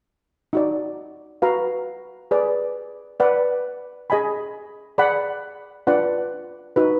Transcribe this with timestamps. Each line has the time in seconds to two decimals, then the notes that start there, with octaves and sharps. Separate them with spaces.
0.53 D#4 F#4 D5
1.42 F#4 B4 F5 A#5
2.31 G#4 B4 D5
3.20 B4 D5 F#5
4.10 G#4 D#5 G#5 B5
4.98 G#4 D5 F#5 B5
5.87 D4 F4 B4 D5 F#5
6.76 D#4 F#4 B4